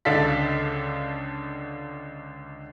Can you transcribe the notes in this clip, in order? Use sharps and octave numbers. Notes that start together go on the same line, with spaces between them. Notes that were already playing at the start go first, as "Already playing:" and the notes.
C#2 D3 A4 D5 F5 B6